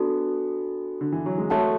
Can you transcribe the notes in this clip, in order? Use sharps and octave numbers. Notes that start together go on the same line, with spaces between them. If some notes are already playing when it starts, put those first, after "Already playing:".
Already playing: B3 D4 F#4 A4
D3
E3
F#3
G#3
A3 F#4 A4 C#5 F#5 A5